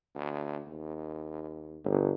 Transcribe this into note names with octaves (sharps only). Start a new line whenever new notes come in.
D2
D#2
G1